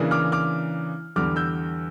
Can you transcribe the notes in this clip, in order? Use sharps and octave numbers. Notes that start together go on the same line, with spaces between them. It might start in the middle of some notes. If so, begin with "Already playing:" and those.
Already playing: C#3 E3 A#3 D4
D6 F6
D6 F6
E2 D3 G3 D6 F6
E6 G6